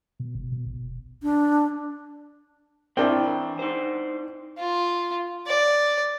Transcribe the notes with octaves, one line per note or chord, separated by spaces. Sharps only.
B2
G1
B2
A1
D#1
D4
E3 C4 D4 E4 G5
D#4 C5
F4
D5